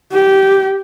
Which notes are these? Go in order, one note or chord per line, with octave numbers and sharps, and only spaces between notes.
G4